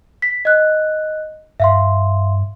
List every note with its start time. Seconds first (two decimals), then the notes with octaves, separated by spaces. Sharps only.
0.22 B6
0.45 D#5 F#6
1.60 G2 E5 F5 C6